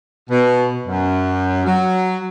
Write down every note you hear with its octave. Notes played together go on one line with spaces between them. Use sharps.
B2
F#2
F#3